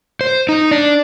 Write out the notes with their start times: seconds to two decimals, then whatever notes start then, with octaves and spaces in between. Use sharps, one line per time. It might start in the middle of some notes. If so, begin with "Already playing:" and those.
0.21 C5
0.49 D#4
0.71 D4